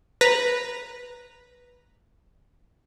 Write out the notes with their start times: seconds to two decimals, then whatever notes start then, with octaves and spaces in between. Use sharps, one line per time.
0.21 B4 A#5